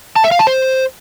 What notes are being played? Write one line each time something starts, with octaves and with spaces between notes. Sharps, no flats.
A5
E5
F5
A5
C5